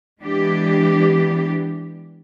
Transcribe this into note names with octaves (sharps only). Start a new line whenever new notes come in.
E3 G#3 B3 D4 G4